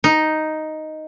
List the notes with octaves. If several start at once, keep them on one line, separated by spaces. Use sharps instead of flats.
D#4